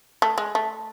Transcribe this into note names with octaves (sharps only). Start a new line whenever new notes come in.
A3
G#3
A3